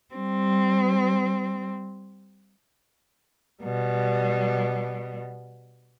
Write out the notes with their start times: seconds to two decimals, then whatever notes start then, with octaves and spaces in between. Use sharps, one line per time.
0.14 G3 C4
3.63 B2 G3